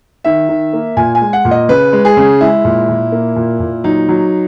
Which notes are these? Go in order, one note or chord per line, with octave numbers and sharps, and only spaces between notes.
D#3 E5
D#3
A#3
A#2 G#5
G#5
G#3
F#5
A#2
D#5
C#3 B4
G#3
G#4
C#3
G#3 E4
A#2
A#2
A#3
A#2
A#2
F#3 D#4
F#3